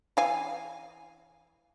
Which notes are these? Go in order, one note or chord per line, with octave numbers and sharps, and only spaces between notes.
E3 F5 G#5